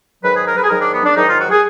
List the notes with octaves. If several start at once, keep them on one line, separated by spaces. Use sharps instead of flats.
G#2 D#3 F#3 B4
G#4
A#4
B4
G#4
G#2 D#3 F#3 A#4
D4
B3
D4
G#2 D#3 F#3 D#4
F4
F#4
G#4